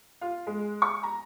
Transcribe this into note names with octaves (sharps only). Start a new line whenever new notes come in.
F4
G#3
C#6
A#5